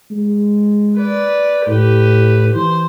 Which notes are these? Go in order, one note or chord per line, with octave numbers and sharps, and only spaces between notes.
G#3
B4 D5
A2 G4 B4
E3 C5